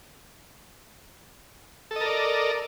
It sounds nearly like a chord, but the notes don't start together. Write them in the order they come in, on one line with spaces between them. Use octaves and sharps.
A4 D#5 A#4 D5